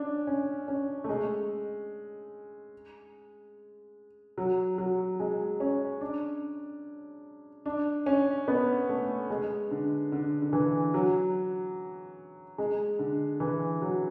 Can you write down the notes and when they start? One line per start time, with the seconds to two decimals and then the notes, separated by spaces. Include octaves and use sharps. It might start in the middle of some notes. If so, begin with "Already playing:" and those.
Already playing: C#4 D4
0.27 C#4
0.68 C#4
1.04 A3
1.09 G#3
4.38 F#3
4.78 F#3
5.20 G#3
5.60 C#4
6.01 D4
7.66 D4
8.06 C#4
8.48 B3
8.89 A3
9.30 G#3
9.71 D3
10.12 D3
10.42 D3
10.53 E3
10.94 F#3
12.58 G#3
12.99 D3
13.40 E3
13.82 F#3